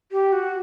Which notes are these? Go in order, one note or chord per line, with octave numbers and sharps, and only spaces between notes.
G4
F#4